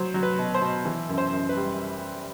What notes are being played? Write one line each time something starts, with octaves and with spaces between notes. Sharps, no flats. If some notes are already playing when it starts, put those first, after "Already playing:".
Already playing: F#3 C5
F#3
B4
B2
C5
B2
E3
F#2
C5
F#2
B4
G3